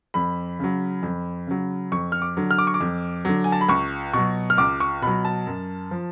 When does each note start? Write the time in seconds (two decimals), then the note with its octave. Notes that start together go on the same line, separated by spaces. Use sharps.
0.14 F2 B5
0.59 C#3 F#3
1.03 F2
1.47 C#3 F#3
1.92 F2 C#6
2.12 F6
2.22 D6
2.37 D3 F#3
2.51 F6
2.59 D6
2.67 C#6
2.74 D6
2.81 F2
3.25 D3 F#3
3.44 G#5
3.52 A5
3.61 B5
3.69 C#2 C#6
4.13 B2 F#3 C#6
4.50 F6
4.58 C#2 D6
4.80 C#6
5.02 B2 F#3 B5
5.25 A5
5.47 F#2
5.91 F3